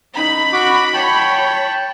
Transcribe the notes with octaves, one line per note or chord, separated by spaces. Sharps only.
C#4 D#4 B5
F#4 D6
C#5 G5 A5